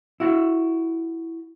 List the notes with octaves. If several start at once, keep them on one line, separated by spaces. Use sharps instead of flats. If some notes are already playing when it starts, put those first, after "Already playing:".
E4 F#4